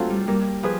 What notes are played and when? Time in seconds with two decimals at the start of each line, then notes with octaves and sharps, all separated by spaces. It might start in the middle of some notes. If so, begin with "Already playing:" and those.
Already playing: F#3 A3 C4 F4
0.10 G3
0.28 G3 A#3
0.63 F3 G#4 B4